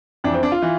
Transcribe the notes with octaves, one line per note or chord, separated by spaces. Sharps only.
F2 E3 D4
C4
D4
F4
E3